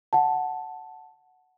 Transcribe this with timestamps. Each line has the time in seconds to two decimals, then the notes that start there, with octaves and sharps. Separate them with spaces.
0.13 F#5 A5